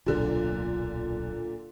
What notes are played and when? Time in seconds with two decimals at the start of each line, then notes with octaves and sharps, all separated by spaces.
0.06 D1 B1 A#2 D3